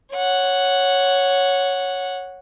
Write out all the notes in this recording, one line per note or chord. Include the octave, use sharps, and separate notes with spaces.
C#5 F#5